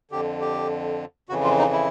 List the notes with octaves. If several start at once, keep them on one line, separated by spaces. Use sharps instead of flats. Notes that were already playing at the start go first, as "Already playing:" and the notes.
F2 D3 G4
G4
F2 C#3 E3 F#4
F4
D#4
E4